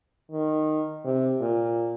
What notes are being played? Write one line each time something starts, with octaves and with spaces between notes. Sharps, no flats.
D#3
C3
A#2